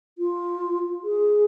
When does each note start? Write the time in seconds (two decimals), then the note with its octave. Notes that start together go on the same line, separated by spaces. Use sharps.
0.18 F4
1.04 G#4